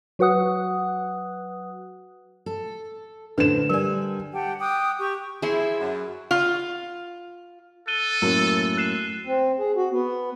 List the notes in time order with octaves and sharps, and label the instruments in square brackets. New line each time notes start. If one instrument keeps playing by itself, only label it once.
[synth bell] F#3 F#4 B4 F#5 D#6 F#6
[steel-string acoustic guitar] A4
[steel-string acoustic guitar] A2 C5 [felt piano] D3 E7 [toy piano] B4
[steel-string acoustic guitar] G3 G#5 [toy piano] A#4 D5
[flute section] G4 F#5 G5 A5
G5 D6 D#6 F#6
G4 C#6
[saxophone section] F3 E4 [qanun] G#4 C6
[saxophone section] F#2
[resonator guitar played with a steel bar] F4
[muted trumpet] A4 [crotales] F#6 D#7 G7
[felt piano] F#2 A2 A#3 [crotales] E6
[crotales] F#6 C7 E7
[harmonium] C4
G#4
F#4
B3